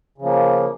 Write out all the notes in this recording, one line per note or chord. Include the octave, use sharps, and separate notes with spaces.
C#3 F3 A#3